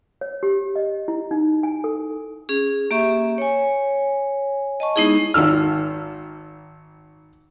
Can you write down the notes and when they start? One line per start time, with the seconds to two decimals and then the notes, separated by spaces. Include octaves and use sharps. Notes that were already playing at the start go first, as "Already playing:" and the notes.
0.21 C#5
0.43 G4
0.76 D#5
1.08 E4
1.31 D#4
1.63 G#5
1.84 A4
2.49 C#4 G#4
2.91 A#3 G4 E5 C#6
3.38 C#5 G#5
4.80 D#5 A5 C#6
4.96 G#3 B3 D#4 E4 G#4
5.34 G#1 D#3 E6 F6